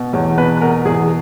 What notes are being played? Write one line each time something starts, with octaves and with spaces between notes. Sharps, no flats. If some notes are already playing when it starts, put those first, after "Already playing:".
Already playing: B2
E2 C#5
B2 B4
B2 A#4
E2 G#4